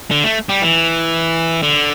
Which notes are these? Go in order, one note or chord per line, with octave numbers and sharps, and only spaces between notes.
D3
A3
G3
E3
D3